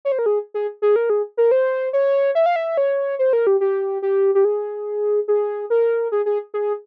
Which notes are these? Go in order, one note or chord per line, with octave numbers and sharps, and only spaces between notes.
C#5
C5
A#4
G#4
G#4
G#4
A#4
G#4
A#4
C5
C#5
E5
F5
E5
C#5
C5
A#4
G4
G4
G4
G4
G#4
G#4
A#4
G#4
G#4
G#4